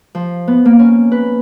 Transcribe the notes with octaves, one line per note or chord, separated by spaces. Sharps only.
F3
B3
A#3
C#4
B4